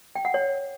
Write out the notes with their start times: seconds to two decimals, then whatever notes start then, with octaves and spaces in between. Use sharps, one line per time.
0.15 G5
0.25 F#5
0.34 C#5